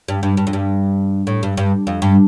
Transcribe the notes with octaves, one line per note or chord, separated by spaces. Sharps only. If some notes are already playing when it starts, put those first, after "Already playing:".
G2
G2
G2
F2
G2
A2
G2
G2
F2
G2